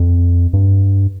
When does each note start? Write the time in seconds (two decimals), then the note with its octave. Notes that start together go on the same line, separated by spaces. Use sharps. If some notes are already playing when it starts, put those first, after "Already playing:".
Already playing: F2
0.53 G2